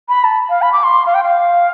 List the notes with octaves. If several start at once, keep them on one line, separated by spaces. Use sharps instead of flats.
B5
A5
F5
B5
D6
C6
F5
G5
F5